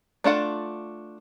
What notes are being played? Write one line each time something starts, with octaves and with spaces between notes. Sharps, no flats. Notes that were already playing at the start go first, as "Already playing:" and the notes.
A3 D4 F4 F#5